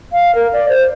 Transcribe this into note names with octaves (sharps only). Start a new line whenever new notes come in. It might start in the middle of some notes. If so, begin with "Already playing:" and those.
F5
A#4
D5
C5